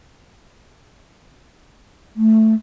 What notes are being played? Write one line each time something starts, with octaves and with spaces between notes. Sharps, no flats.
A3